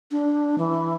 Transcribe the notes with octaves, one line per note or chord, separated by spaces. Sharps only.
D4
E3